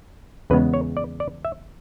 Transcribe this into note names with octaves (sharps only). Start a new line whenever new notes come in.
E2 C#3 G#3 B3 B4
C#5
D5
D5
E5